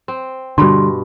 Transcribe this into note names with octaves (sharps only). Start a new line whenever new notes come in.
C4
G2 B2 D3 G3 C6